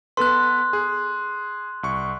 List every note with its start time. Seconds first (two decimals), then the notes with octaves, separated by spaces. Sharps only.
0.17 B3 A4 B4 C6 F#6
0.73 G#4
1.83 C2 C#6